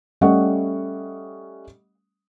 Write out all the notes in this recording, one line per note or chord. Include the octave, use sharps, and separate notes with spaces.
G3 A3 C#4 D#5 F#5 C#6